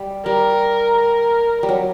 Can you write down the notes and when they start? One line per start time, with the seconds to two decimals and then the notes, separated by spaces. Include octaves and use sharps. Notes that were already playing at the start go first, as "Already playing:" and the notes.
Already playing: G3
0.25 G3 A#4
0.97 A#4
1.63 G3
1.69 F#3